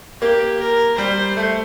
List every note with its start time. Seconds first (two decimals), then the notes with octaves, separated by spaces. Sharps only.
0.21 A#3 G4
0.60 A#4
0.98 G3 C5
1.37 A3